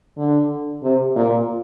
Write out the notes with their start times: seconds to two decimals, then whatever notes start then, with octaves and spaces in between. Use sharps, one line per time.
0.17 D3
0.83 C3
1.16 A#2